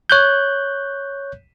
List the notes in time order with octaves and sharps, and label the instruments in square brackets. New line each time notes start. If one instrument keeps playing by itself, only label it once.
[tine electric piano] C#5 F#6 G6